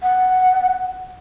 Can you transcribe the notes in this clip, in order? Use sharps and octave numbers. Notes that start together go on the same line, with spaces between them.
F#5